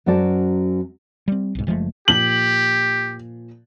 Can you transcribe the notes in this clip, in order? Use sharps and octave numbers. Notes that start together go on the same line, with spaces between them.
F#2 F#3 C#4 C5 D5 A5
G3 C4
B1 G#2
F#1 F3 G#3 A3
A#2 F3 G4 F#7